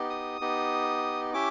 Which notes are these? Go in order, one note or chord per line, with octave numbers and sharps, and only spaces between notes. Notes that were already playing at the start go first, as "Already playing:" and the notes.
Already playing: B3 D#4 G4
D#6
B3 D#4 G4
C#4 E4 G4 D6